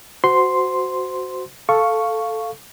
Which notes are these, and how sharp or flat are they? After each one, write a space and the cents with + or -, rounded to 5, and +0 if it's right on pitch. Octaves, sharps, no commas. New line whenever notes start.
F#4 +0 C5 -20 C6 +0
A4 +0 F5 +0 C#6 +0